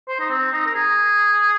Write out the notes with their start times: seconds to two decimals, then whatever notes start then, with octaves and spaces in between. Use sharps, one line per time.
0.08 C5
0.20 D#4
0.30 C4
0.53 D#4
0.66 A#4
0.74 G#4